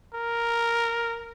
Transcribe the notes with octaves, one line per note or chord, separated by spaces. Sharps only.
A#4